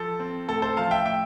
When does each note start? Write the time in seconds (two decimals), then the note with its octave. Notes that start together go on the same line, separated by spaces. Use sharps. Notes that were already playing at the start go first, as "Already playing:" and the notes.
Already playing: F3 A4
0.20 C4
0.48 A2 A4
0.62 A4 C5
0.77 F3 F5 A5
0.91 E5 G5
1.05 A2 E5 G5